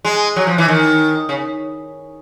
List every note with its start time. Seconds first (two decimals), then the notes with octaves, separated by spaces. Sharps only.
0.05 G#3
0.36 F#3
0.47 F3
0.58 E3
0.68 D#3
1.29 C#3